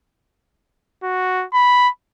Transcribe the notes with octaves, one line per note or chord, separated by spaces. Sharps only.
F#4
B5